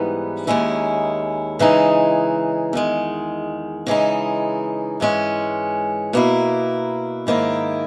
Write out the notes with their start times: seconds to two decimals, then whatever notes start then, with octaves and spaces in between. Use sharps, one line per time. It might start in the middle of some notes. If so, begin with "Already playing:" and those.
Already playing: G#2 E3 G3 B3 D#4
0.47 D#2 D#3 G#3 C#4 E4
1.59 C#3 E3 G#3 D#4
2.73 E2 D#3 G#3
3.87 C#3 E3 G#3 D#4
5.00 G#2 E3 G#3 C#4
6.13 B2 A#3 E4
7.27 G#2 D#3 A#3 E4